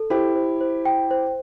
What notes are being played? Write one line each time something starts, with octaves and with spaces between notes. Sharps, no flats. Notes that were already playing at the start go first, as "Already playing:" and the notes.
Already playing: A4
E4 G4 C5
C5
C5
G5
C5